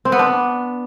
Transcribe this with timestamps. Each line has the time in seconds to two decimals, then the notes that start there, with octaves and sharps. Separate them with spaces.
0.05 C4
0.12 B3
0.19 D4